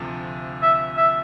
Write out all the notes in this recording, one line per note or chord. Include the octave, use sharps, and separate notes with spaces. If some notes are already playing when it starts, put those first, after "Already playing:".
Already playing: D2 C3 F3 A3
E5
E5